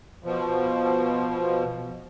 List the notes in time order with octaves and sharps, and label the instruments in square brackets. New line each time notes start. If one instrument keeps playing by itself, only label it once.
[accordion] B2 F3